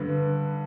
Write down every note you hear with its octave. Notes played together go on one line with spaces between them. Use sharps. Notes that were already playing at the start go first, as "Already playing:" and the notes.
Already playing: G2 D3 B4